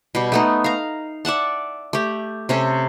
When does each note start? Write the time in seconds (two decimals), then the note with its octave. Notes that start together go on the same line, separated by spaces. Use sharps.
0.15 B2 G3
0.32 A3 B3 D#4
0.64 F5 A#5
1.25 D5 E5 F#5 A5
1.93 A3 G4
2.49 C3 C#4 A4